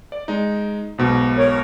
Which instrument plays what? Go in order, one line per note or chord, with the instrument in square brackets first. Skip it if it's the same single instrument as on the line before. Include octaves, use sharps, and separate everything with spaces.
[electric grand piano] D5
G#3 D#4
B1 G#2 B2
[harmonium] A#4 C#5